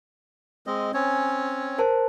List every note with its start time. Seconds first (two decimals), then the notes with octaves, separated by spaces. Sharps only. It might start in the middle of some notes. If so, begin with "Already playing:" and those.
0.67 G#3 C4 D#5
0.94 C4 C#4 C#5 G5 G#5
1.78 A#4 C5 A5